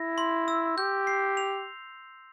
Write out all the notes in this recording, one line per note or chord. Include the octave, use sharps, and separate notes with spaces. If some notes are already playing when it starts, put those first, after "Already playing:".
Already playing: E4 A#6
C6
E6
G4 G6
C7
F7